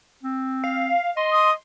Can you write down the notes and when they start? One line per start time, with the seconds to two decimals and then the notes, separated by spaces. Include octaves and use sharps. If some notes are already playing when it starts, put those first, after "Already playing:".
0.23 C4
0.64 F5
1.17 D#5 C6
1.32 D#6